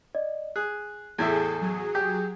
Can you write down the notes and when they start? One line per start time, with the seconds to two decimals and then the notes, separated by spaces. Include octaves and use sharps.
0.15 D5 D#5
0.56 G#4 F#6
1.18 E2 A2 G#4 A4 E5
1.61 F#3 G#4
1.95 G4 G6